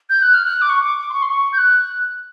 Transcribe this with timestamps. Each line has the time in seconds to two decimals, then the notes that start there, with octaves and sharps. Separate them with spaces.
0.10 G6
0.22 F#6
0.34 F6
0.45 F#6
0.61 D6
0.69 C#6
0.84 D6
0.99 D6
1.10 C6
1.13 C#6
1.22 C6
1.28 C#6
1.53 G6
1.58 F#6